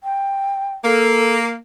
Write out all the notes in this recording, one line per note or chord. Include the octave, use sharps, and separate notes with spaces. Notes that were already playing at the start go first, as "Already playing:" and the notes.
G5
A#3 A4